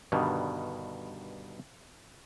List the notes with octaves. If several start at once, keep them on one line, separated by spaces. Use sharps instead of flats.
G2 B2 D3 D#3 G3